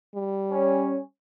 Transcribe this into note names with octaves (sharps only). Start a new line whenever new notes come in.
G3
C#4